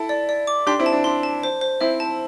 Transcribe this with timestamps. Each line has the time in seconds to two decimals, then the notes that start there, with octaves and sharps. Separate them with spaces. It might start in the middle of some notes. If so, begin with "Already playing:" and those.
Already playing: E4 A4
0.09 D5
0.29 D5
0.47 D6
0.67 D4 G4 C6
0.79 C4 E4
0.86 A5
0.92 D4
1.04 D4 C6
1.23 A5
1.43 C5
1.61 C5
1.81 C4 E4 E5
2.00 A5